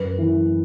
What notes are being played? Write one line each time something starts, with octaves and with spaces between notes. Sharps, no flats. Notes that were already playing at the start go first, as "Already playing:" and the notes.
Already playing: F#2 B4
E3